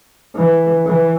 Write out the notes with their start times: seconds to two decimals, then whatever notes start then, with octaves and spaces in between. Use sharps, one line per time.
0.36 E3
0.86 E3